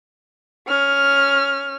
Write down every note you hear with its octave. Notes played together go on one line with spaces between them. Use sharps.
C#4 F6